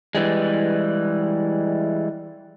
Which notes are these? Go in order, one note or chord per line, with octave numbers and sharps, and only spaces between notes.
E3 G3 G#3